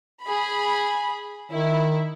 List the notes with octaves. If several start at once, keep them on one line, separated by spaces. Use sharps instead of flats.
G#4 B5
D#3 E4